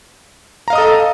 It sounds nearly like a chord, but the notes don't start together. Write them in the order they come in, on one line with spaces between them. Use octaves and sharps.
A#5 F5 D#5 D#6 A4